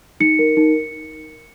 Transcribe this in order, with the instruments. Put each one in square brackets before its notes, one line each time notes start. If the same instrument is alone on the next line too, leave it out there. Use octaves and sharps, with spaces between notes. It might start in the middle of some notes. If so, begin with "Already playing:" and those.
[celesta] D#4 C#7
A#4
D#4